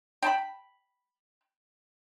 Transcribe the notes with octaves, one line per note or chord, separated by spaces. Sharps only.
G5 A5 B5